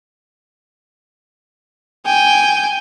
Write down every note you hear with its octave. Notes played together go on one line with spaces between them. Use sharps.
G5 G#5